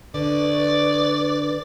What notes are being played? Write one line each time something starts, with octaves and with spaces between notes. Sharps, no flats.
D3 B4 D5